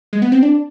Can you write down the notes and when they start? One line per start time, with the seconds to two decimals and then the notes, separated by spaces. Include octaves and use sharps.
0.13 G#3
0.22 B3
0.32 C4
0.43 D4